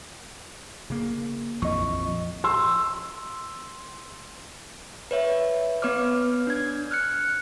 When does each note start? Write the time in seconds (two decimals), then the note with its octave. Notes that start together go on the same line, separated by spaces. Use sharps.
0.90 C#3 A#3
1.62 A#1 F2 E3 D#5 C#6
2.08 F3
2.44 C6 E6
5.11 B4 C#5 E5
5.82 B3 B4 C#5 D6 F6
6.47 D4 G#6
6.91 F6 F#6 C#7